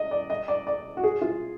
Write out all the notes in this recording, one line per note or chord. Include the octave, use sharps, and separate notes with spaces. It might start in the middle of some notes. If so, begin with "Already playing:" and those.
Already playing: D#5
D5
D#5
D5
D5
F#4
G#4
F4